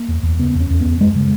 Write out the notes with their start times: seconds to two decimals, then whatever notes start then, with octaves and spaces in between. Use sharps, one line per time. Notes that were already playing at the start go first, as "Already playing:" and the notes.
Already playing: A#3
0.08 E2
0.23 E2
0.39 C#3 B3
0.55 E2
0.60 C#4
0.70 E2
0.81 E2 B3
1.01 F#2 G#3
1.15 C#3